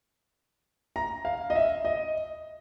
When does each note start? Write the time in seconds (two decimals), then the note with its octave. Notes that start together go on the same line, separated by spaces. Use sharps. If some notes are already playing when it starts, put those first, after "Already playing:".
0.96 A#5
1.25 F5
1.50 D#5
1.56 E5
1.85 D#5